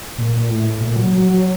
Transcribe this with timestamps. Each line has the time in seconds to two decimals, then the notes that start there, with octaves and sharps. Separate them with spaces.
0.18 A#2
0.49 A2
0.80 A#2
0.96 F#3
1.12 F#3